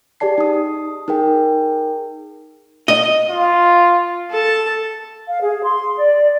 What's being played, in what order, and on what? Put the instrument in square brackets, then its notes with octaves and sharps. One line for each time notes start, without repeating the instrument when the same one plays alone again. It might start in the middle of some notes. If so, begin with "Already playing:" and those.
[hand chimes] G4 G#4 D5 A5 C7
D#4 D#6
D#4 G#4 A#4 G5
[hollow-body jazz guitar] D#5
[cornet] F4
[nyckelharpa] A4 A5
[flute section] F5
G#4
C6
D5